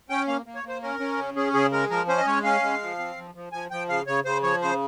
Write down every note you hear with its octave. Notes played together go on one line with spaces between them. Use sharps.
C#4 G5
A#3 F5
A#3
C#5
A#3 C5
C#4 A#4
C#4
C#3
C#4 G#4
C#3 G#4
G#3 A#4
F3 A#4
C#4 C5
D#5
G#3 C#5
C#4 F5
G#3
F3
C4
F3
F3
F3 G#5
F3 G5
C#3 F5
C#3 C#5
C#3 C5
F3 C#5
C#3 C5